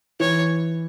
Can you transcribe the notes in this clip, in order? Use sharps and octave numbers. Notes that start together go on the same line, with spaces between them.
E3 C#5